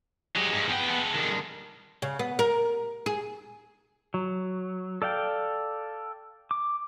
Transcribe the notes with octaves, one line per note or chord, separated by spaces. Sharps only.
F#3 D#4 G4 G#4
G2
E2 B3 G5
G#3 A4
D#3 D4
C#3
B3
A#4
G#4
F#3
A4 D5 F5 G5
D6